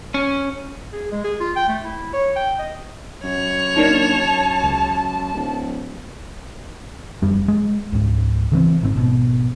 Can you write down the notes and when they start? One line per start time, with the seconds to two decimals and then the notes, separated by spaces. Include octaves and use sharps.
0.14 C#4
0.93 G#4
1.12 G#3
1.24 G#4
1.40 F4
1.56 G5
1.68 A3
1.85 E4
2.13 C#5
2.36 G5
2.59 D#5
3.23 F#2 C#5 F7
3.77 A#3 D4 D#4 A5
4.63 C#2
5.34 D1
7.22 F1 F#2 G3
7.48 G#3
7.93 C#2 G#2
8.52 C#3 E3 A#3 C4
8.82 G#1 G#2 C4
8.94 G#1 B2